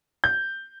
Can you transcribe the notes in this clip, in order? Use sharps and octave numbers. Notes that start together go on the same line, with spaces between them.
G6